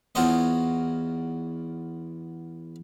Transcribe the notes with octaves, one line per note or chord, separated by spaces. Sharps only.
E2 F4 F#4 C5 C#5 D#5